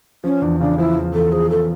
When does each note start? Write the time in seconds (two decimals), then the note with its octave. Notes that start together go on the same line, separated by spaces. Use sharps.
0.24 F3 C#4
0.42 E2 D4
0.60 C#3 D4
0.78 F3 E4
0.96 E2
1.14 E2 A4
1.32 F3 G#4
1.50 E2 A4